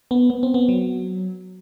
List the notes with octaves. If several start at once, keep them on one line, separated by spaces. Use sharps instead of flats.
B3
B3
C4
B3
F#3